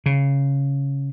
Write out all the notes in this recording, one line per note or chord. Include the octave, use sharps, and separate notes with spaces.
C#3